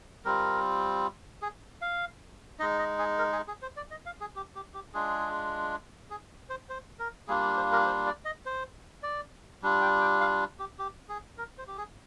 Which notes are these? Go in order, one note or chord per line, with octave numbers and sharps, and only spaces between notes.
G3 C4 F4 A#4
G#4
F5
G#3 D#4 D#5
D#5
G#4
A#4
G#4
G#4
C5
D5
D#5
F5
G#4
G4
G4
G4
G#3 D4 F4 G#4
G#4
C5
C5
A#4
G3 A#3 D4 F4 G#4
C5
A#4
C5
D5
D#5
C5
D5
G3 D4 F4
G5
G5
F5
G4
G4
G#4
A#4
C5
G4
G#4